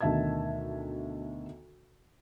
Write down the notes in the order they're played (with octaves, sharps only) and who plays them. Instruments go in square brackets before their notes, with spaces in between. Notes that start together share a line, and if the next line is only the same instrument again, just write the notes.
[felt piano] D2 B2 D#3 E5 A5 G#6